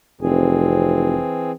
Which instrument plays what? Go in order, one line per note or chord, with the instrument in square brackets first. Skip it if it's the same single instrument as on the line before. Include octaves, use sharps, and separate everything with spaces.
[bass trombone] F1 [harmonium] E3 C4 G#4